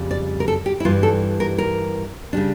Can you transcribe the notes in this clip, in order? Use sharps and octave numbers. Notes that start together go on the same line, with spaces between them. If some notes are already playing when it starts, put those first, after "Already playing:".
Already playing: F2 C#3 G3
D5
A#4
A4
G4
E4
G2 E3 G3 F4
A4
A#4
A#4
C#3 G3 D4